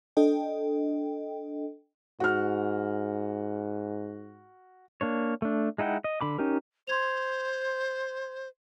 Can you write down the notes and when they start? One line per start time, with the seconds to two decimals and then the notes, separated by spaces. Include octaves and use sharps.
0.17 D4 A4 D#5 G5
2.20 G#2 F#4 F6
5.01 A#3 D4 C#5
5.42 A3 D4
5.78 G#3 D#4 E4 F#5 G5
6.04 D#5
6.21 D3 B5 D6
6.38 C#4 D#4 G4 A#4
6.87 C5 C6 G#6 F7